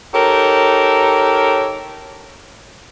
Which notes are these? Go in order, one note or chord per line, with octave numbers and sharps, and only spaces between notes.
D#4 G4 A4 A#4 C#5